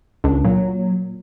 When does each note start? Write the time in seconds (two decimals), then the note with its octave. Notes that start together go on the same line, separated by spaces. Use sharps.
0.24 C#2 D4
0.44 A#2 F#3